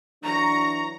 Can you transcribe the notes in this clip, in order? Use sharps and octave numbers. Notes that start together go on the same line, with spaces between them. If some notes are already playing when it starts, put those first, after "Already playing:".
E3 F#3 D4 A#5 C#6